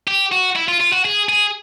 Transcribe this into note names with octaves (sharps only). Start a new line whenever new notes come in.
G4
F#4
E4
F4
F4
F#4
G#4
G#4